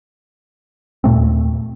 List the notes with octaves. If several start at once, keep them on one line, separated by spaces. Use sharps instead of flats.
D#2 A#2 A3 C4